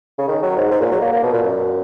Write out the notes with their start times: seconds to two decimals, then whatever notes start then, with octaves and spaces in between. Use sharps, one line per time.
0.18 C#3
0.28 D#3
0.43 F#3
0.56 G#2
0.71 G#2
0.81 A#2
0.91 F#3
1.01 A#3
1.12 A#3
1.23 B2
1.33 A#2
1.43 F#2